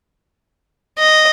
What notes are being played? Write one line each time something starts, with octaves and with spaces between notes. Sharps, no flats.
D#5